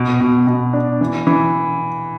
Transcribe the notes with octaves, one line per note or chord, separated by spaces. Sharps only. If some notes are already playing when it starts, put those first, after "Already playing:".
Already playing: B2
B2
B2
D4
E3
E3